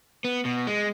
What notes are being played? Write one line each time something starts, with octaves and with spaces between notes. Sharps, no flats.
B3
B2
G#3